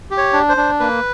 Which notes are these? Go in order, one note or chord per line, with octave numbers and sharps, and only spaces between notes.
G4
C#5
D4
C5
D4
A#3 B4